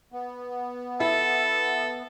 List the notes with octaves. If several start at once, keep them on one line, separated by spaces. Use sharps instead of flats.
B3
E4 A4